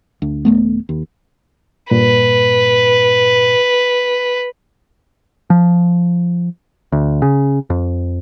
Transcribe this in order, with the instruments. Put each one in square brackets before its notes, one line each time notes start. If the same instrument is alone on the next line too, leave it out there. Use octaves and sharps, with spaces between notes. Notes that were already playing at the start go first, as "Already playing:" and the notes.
[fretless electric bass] D2
D#1 G#1 A3 B3
D#2
[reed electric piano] G2 A#2 [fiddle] B4
[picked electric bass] F3
D2
C#3
F2